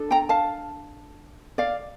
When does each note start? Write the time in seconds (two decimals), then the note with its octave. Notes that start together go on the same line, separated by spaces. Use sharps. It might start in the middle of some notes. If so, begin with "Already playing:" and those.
Already playing: D4 A4
0.11 G5 A#5
0.29 F5 A5
1.58 D5 F5